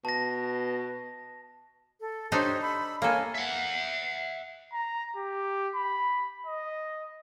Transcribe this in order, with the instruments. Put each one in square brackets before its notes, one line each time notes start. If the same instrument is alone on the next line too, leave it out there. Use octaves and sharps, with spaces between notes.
[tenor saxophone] B2 [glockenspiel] A5 A#6
[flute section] A4
[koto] D4 D#4 A4 [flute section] G4 C5 C#5
[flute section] B5 E6
[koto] A#3 A4 [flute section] A#4 C#5 G#5
[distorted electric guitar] E5 F#5
[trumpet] A#5
G4
B5
D#5